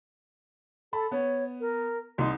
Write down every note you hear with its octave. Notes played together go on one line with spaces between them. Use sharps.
A4 A5 B5
B3 C#5
A#4
C2 D#4 C6